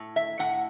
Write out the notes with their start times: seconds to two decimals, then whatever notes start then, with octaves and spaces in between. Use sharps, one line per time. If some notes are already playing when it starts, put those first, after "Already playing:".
Already playing: A2
0.16 E5
0.39 A2 F#5